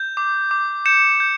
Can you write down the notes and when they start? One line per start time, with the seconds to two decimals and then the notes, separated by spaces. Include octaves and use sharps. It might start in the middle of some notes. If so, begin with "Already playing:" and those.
Already playing: G6
0.17 D6
0.51 D6
0.86 G6 C#7 E7
1.20 G6